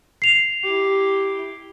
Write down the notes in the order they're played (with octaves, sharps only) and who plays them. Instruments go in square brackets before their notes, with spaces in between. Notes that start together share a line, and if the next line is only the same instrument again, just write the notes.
[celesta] C7 F7
[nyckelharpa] E4 G4